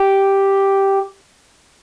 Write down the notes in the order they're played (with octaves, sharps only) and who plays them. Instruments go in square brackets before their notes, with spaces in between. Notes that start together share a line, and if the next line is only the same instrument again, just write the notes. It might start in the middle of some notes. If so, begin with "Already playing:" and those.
Already playing: [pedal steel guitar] G4